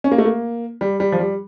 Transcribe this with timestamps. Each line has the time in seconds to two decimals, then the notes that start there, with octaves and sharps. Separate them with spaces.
0.04 C#4
0.12 A#3
0.18 A3
0.25 A#3
0.81 G3
1.00 G3
1.12 F3
1.19 G3